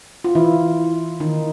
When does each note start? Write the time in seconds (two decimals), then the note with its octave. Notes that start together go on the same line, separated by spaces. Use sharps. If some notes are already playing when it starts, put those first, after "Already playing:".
0.24 F4
0.35 E3 E4
1.20 D#3 D#4